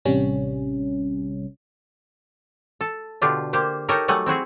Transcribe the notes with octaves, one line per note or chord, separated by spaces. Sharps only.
A1 C3 G3 C#4
A4
B2 D3 D4 F4 G4
A#3 G4 C5
D#4 G4 A4 A#4 C#5 D#5
F#3 G3 A3 F#5 G#5
C4 E4 F#4 G#4